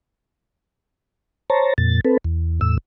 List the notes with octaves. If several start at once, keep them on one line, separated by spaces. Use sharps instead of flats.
C5 C#5 A5 A#5
F2 A#2 A6
C4 A4 B4
E2
E2 A2 E6